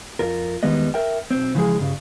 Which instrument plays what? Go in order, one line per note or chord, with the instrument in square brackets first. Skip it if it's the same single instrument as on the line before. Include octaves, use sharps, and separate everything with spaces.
[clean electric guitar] F2 F4 A#4
E2 D#3 G3 G#3 B3 D#5
A#4 E5 G5
B1 C4
C#3 E3 F3 G3 G#3 G#4
C#2 G2 C#3